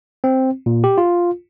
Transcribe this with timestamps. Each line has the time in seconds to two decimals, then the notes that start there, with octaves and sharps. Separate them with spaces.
0.24 C4
0.66 A#2
0.84 G4
0.98 F4